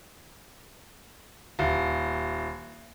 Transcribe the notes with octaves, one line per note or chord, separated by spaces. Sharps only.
D#1